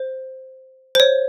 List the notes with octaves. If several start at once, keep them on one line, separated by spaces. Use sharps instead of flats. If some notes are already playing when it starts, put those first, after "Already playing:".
Already playing: C5
C5
C#5